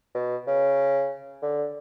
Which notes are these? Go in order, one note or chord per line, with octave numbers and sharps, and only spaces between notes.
B2
C#3
D3